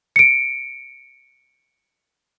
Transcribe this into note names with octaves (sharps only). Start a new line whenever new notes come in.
C#7 D7